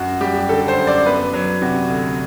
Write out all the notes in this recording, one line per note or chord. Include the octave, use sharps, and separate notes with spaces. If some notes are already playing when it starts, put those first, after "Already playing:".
Already playing: F#2 F#4
G3 G4
G4
D3 A4
C5
F#2
D5
B3 B4
F#3
C3 F#4
D2